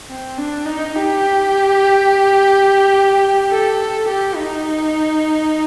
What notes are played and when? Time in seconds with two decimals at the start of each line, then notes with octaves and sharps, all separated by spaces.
0.10 C4
0.38 D4
0.66 D#4
0.95 G4
3.51 A4
3.79 A4
4.08 G4
4.36 D#4